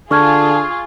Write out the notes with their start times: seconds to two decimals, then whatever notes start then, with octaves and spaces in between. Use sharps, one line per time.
0.11 D3 F4 G#4 A5 C#6 F6 G#6